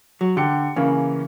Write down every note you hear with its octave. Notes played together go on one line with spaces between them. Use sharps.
F#3
D3 G4 C#7
C#3 E3 A#3 C#4